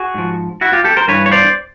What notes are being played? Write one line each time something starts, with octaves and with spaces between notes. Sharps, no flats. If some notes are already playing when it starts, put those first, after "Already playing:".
Already playing: F#4 G#4
G#2 F3
E4 F#4
F4 G4
G4 A4
A#4 C5
G2 E3 B4 C#5
C#5
C5 D5